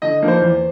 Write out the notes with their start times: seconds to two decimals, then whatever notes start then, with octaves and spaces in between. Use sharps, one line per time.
0.02 D3 D#5
0.22 F3 A#3 D#4
0.28 C5
0.42 E2